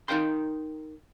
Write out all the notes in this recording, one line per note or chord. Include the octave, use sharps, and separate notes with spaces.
D#4 E4 A#4 F5 G5 C6